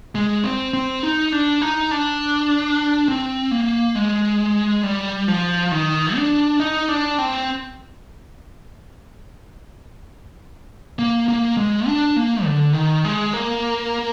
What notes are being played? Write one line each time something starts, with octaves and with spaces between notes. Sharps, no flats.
G#3
C4
C4
D#4
D4
D#4
D4
C4
A#3
G#3
G3
F3
D#3
D4
D#4
D4
C4
A#3
A#3
G#3
D4
A#3
D3
D#3
G#3
A#3